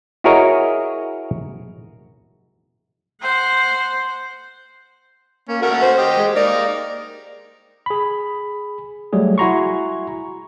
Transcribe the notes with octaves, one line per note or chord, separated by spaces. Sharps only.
E4 F#4 G#4 A#4 C#5 D#5
C5 F#5
A#3 C#4
A3 C#4 F#4 A#4
C5
G4 D#5
G#3
A#3 D#4 D5
G#4 B5
F#3 G3 A3 G#4
E4 F#4 G#5 A#5 C6 C#6